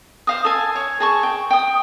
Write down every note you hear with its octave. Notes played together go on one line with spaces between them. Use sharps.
C5 F5 D#6
A4 G#5
C#5
G#4 A5 C#6
G5
G5 D#6